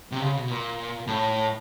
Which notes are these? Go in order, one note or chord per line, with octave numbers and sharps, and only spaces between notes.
C3
C#3
B2
A#2
A2